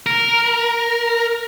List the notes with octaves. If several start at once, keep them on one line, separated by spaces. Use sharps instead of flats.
A#4